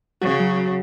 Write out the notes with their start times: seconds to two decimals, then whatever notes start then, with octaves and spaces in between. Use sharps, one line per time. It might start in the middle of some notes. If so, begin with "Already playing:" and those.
0.21 C#3 F#4
0.40 F#3
0.57 F#3